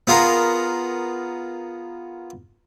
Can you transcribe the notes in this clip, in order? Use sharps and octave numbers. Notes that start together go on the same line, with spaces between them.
B3 F4 G#4 A#4